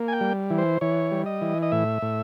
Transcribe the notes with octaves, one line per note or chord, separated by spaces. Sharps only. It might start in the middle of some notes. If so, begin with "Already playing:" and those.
Already playing: A#3
G#5
G5
G3
E3
C5
E3 C#5
G3
D#5
E3
D#5
A2 E5
A2